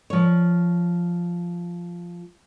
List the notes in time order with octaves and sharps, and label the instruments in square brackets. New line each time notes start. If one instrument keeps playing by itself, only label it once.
[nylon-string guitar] F3 C#5